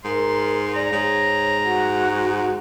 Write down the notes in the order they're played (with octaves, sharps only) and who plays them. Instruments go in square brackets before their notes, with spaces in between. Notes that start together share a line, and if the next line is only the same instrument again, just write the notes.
[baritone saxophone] G#2 [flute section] A#4 [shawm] C6
[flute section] D5 [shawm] A#5
[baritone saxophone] G#2 [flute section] C#5
[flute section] F#4 F#5